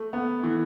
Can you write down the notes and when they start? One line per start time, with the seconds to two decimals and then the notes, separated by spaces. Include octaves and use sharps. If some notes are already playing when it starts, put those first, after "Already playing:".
Already playing: A3
0.13 B3
0.43 E3